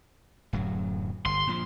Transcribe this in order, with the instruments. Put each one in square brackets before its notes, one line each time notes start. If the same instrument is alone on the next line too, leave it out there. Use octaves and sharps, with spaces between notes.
[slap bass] D1 F#2 F#3
[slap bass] G1 [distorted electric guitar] C6
[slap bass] A#2 F3